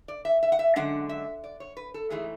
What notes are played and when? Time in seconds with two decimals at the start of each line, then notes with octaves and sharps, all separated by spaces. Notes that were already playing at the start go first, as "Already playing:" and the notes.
0.08 D5
0.25 E5
0.43 E5
0.52 F#5
0.59 E5
0.76 F#2 D3 G#3 D4 F#5
1.09 E5
1.44 D5
1.60 C#5
1.77 B4
1.94 A4
2.10 G#2 E3 A3 G#4